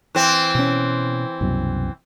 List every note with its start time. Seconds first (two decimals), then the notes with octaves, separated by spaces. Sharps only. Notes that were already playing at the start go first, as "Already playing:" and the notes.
0.15 E3 C4
0.55 B2 C#4
1.41 C2 F#2 B2